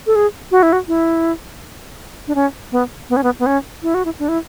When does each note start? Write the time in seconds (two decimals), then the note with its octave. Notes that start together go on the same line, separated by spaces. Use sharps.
0.07 A4
0.16 G#4
0.51 F#4
0.63 E4
0.73 F#4
0.88 E4
2.28 D4
2.35 C#4
2.72 B3
3.10 B3
3.17 C#4
3.24 B3
3.39 B3
3.46 C#4
3.83 E4
3.94 F#4
4.05 E4
4.19 D4
4.29 E4